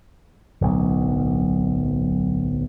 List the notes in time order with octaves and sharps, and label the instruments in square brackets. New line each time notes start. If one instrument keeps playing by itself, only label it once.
[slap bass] D1 B1